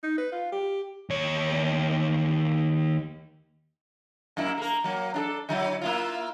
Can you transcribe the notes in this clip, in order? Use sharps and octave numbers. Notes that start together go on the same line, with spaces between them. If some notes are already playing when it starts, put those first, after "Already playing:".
D#4
B4
F4
G4
D#2 C#5
F#2 A#3 E4
A#3 A#4
F#3 A#3
D4 F4 A4
D3 F#3 E4
A#3 E4 F4